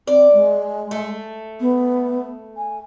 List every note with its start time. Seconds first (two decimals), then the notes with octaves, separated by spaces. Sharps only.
0.07 C4 D5
0.33 G#3
0.91 A3
1.60 B3
2.57 G#5